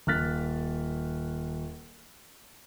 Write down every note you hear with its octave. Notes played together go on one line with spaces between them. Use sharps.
D#1 A#3 F6 F#6 A6 B6